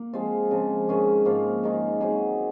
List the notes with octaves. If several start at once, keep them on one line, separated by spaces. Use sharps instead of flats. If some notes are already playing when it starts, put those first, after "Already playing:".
Already playing: A#3
F3 G#3 C4 F4
C#3 F3 C4
D#3 G#3 C#4 G#4
G#2 F3 A#3 F4
D#3 G#3 D#4
F#3 C4 D#4 G#4